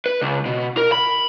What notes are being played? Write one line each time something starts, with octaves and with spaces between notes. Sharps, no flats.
B4
C#2
B2
A#4
B5